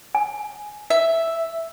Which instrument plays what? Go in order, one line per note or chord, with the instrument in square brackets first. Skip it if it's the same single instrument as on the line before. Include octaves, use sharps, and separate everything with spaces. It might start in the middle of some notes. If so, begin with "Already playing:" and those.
[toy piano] G#5
[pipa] E5